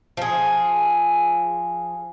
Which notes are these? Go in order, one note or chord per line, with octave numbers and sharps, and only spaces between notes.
F3 G#4